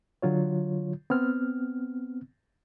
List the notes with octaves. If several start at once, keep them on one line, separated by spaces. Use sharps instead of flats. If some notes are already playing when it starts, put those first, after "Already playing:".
D3 F#3 F4 C#5
B3 C4 F6